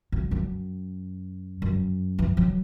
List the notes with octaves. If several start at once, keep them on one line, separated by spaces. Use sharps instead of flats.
F#2
F#2
F#2
E3
F#3